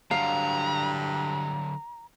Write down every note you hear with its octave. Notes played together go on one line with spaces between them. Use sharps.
G2 D3 F#3 F5 A#5